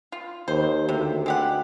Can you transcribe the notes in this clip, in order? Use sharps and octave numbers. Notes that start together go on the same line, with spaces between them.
F4
D#2 C5
D2 C3
G#3 G4 F#5